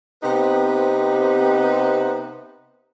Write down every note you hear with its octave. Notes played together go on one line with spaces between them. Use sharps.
C3 B3 C4 D#4 G4 B4